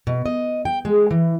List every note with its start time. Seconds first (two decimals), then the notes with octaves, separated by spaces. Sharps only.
0.07 B2
0.26 D#5
0.65 G5
0.85 G#3
1.11 E3